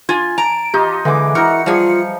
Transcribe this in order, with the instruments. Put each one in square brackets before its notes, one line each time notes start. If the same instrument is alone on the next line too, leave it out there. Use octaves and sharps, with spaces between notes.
[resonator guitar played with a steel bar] F4 [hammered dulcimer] G#5
[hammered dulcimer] A5 [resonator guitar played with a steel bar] A#5 [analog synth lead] D7
[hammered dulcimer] D#4 F4 D#5 [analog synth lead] G4
[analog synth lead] D3 [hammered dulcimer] E3 G#3 D6
[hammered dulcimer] D#4 F#4 [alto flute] E4 [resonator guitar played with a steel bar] A#4 [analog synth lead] C#7
[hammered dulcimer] F3 [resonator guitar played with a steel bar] G3 G#4 [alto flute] F4